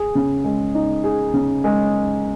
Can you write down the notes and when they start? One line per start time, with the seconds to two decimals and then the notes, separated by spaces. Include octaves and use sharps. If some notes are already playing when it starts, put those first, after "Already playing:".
Already playing: G#4
0.15 C#3
0.44 G#3
0.75 D#4
1.04 G#4
1.34 C#3
1.64 G#3